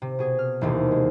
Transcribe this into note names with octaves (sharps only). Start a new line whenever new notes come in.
C3
B2 G#4
F6
E1 D#2 C3
G#3